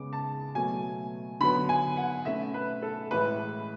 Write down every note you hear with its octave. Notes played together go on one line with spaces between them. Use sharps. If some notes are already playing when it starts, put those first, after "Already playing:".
Already playing: C#3 G#3 B3 D6
A5
B2 F#3 A3 G#5
D3 F#3 B3 B5
G#5
F#5
B2 A3 C#4 E5
B4
A4
A2 E3 G#3 B4